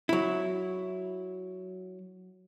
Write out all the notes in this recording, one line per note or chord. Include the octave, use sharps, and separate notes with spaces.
F#3 E4